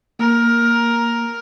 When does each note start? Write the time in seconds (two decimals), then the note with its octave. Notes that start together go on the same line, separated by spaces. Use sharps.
0.19 A#3 A#4